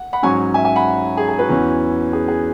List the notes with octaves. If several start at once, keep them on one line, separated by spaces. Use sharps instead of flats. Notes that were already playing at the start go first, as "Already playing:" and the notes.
Already playing: F#5
F#5 B5
G#2 F#3 C#4 G#5 C#6
E5 G#5
E5 G#5
F#5 B5
G#4
G#4
F#4 B4
E2 E3 C#4
G#4
G#4